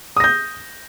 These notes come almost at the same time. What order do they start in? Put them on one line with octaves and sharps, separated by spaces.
D#6 A#6 G6